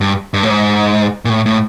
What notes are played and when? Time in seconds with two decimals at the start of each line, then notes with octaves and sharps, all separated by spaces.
0.01 G2
0.34 G2
0.43 A2
0.50 G#2
1.25 A#2
1.29 A2
1.46 A2